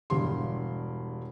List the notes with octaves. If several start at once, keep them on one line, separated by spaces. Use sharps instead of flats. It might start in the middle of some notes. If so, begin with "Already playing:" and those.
E1 G2 C6